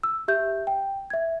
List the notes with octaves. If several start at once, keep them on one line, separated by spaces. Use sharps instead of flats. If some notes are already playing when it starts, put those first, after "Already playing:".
E6
G4 E5 G6
G5
E5 G#6